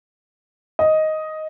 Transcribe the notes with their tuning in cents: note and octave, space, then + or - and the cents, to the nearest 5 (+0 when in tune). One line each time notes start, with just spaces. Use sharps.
D#5 +5